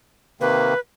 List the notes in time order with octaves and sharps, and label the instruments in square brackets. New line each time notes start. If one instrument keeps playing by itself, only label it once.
[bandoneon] C3 D#3 A#3 [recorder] B4